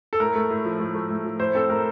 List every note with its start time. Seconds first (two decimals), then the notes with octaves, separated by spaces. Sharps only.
0.13 A4
0.20 A2 A#4
0.35 A3
0.50 A2
0.65 F3
0.80 A2
0.95 A3
1.10 A2
1.25 F3
1.39 A2 C5
1.55 C4 A4
1.70 A2 A#4